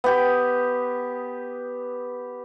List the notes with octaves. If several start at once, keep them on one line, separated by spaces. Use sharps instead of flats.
B3 G4